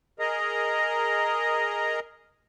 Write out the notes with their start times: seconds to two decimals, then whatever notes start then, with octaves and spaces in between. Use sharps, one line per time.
0.19 G#4 A#4 D#5 A#5